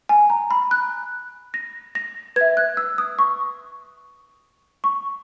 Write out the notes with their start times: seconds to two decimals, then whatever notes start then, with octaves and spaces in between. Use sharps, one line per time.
0.09 G#5
0.30 A#5
0.51 B5
0.71 F#6
1.54 A#6
1.95 A#6
2.36 B4 E5 G#6
2.57 F#6
2.77 E6
2.98 D#6
3.19 C#6
4.84 C#6